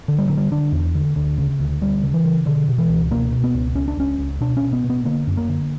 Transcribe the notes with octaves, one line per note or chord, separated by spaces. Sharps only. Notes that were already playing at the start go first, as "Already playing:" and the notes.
D3
G3
D3 F#3
G3
D3 D4
E2
D3
D2
C#3
D2
D2 G3
C#3
E3
C#3
B2 D3
B2
E3
C#2
B2 A#3
B2
B3
C#2
C#2 C#4
D4
C#2 C#4
C#2
B2 D4
C#4
B2
B3
B2
B3
D3 A#3
F#2
A#3
D3